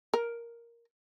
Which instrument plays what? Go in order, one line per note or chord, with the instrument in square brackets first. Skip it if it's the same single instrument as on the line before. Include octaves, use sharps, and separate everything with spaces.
[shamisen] A#4